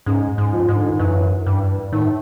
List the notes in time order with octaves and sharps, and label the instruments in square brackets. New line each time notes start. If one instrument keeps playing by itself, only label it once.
[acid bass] G#2 [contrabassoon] C#3
[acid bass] G#2
[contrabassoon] F3
[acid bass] G#2
[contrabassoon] D3
D#3
[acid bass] F#2 [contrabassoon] E3
[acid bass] G2
[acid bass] A2 [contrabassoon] D#3